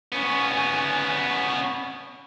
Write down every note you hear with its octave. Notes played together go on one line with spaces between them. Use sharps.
B3 C#4